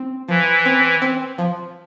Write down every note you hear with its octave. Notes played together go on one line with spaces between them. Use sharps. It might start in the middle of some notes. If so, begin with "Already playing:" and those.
Already playing: C4
E3 F3
C4
C4
F3